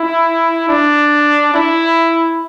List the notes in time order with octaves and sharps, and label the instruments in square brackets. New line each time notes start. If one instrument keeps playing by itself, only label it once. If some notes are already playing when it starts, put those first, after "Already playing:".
Already playing: [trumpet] E4
D4
E4